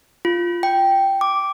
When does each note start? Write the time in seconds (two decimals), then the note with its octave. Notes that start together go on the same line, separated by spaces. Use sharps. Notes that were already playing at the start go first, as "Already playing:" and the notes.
0.25 F4
0.63 G5
1.21 D6